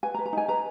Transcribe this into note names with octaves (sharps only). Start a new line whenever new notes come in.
B4 G#5
A#5
B4
A#5
D#4 G#5
B4 A#5